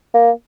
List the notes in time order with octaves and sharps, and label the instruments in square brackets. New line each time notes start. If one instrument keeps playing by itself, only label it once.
[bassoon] A#3